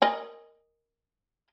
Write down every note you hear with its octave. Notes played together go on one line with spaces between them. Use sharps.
A#4 D#5 G#5